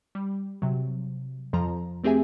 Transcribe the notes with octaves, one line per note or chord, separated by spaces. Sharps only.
G3
C3 F#3
F2 F3 A#5
A3 C4 G4 G#4 E5 G#5